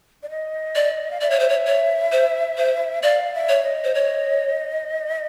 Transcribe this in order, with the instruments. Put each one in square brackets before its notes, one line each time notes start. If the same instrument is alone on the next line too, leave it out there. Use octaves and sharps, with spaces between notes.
[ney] D5
D#5
[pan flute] D5
[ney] F5
[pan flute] D5 [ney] E5
[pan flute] C#5
C5
C#5
C#5
C5
C5
[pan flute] D5 [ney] F5
[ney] E5
[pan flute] C#5
[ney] D#5
[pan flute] C5
C#5